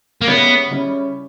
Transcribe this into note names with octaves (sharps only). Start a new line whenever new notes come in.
A#3
C#3 G3 B3 C#4 E4
C#3 G3 C#4 E4